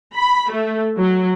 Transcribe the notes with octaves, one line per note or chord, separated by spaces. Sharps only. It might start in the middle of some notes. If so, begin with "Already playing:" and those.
B5
A3
F#3